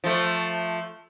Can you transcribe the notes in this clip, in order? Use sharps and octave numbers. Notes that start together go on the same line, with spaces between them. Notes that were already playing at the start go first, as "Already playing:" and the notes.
F3 A3